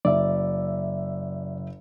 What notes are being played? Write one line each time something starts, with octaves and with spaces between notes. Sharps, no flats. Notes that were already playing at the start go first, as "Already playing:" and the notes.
F#1 D5 E5